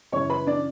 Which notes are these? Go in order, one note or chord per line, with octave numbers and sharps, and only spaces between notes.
F#2 C#3 E3 C#5 C#6
B4 B5
D4 D5